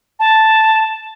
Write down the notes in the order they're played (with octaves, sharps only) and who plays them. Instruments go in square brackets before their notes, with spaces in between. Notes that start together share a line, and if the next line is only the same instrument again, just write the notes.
[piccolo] A5